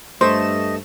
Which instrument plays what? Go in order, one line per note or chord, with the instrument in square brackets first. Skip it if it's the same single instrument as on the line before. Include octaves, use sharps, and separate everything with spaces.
[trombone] G2 [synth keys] A3 E7 [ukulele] C5 [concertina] D#5